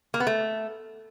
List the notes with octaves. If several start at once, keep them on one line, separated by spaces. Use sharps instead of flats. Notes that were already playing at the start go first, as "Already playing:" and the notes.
A#3
B3
A3